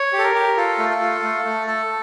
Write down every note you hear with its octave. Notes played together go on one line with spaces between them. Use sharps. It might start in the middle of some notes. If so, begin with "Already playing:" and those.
Already playing: C#5
G4
A4
A#4
G4
F4 A4
A3
A4
F4
A3
A3
A4